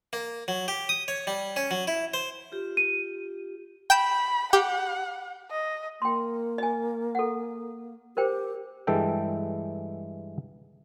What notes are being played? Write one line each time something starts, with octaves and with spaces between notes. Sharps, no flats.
A#3
F#3
G4
D#6
C#5
G3
C#4
F#3
E4
C5
F4 G4
D#7
G5 B5 G6 E7
G4 F#5
D#5
A#3 G5 C6
D#5 G#5
A4 F#5
G4 A#4 C5 G5
G2 E3 G#3 A4 E5 G5